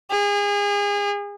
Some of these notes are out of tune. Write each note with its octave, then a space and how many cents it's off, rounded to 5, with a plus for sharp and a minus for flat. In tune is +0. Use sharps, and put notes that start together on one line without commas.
G#4 -30